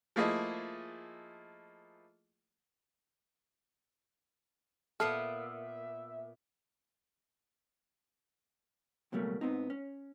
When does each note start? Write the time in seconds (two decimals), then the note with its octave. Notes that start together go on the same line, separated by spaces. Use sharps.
0.16 F3 A3 A#3 E4 G#4 D#5
5.00 A#2 B3 A4 E5 F#5 F6 C7
9.12 C#2 B2 F#3 G3 A3 A#3
9.41 G#2 B3 C4 D#4
9.70 C#4